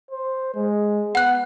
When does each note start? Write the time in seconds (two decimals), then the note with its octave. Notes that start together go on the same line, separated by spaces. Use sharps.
0.11 C5
0.55 G#3
1.15 B3 F#5 F#6